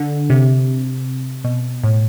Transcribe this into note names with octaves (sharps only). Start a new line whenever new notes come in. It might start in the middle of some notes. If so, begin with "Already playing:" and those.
Already playing: D3
C3
B2
A2